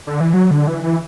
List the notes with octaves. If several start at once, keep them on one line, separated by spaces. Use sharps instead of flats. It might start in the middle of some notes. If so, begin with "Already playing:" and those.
D3
E3
F#3
D3
E3
E3